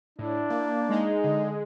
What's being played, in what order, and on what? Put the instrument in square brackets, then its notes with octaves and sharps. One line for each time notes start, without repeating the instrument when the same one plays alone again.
[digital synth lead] A2 [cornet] D4 [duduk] E4
[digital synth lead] A#3
[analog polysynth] G#3 [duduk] D#4
[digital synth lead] D3 [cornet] D#5